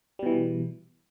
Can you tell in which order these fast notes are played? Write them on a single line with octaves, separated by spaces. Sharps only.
G3 B2 E3